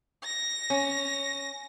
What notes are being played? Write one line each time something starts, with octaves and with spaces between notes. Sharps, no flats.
A#6
C#4